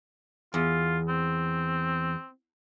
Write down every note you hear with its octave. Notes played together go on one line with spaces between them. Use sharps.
E2 F4
C4